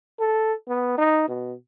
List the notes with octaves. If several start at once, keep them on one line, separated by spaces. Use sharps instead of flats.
A4
B3
D#4
B2